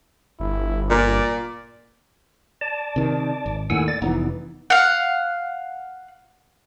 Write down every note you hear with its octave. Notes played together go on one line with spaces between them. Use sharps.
G1 E4
A#2 D5
D5 A5
C3 D#3
G#1
D#2 A2 D#3 F#5 G#5 E6
D5 A6
F1 C3 E3 B3 D#4
F5 F#5